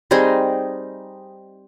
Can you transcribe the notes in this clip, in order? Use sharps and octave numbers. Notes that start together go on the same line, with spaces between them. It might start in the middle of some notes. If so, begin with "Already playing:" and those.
G3 C4 D#4 G#4